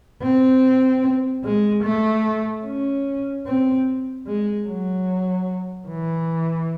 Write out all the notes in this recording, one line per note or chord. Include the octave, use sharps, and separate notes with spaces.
C4
G#3
A3
C#4
C4
G#3
F#3
E3